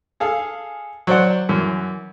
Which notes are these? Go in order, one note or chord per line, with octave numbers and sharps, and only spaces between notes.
G#4 A4 F5
F#3 C5 D5 F#5
F#2 E3